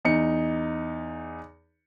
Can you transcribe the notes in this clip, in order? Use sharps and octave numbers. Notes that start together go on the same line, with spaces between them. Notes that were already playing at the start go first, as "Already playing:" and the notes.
E2 D#4 C#7